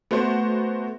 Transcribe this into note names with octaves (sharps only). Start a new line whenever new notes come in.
A3 B3 F#4 C5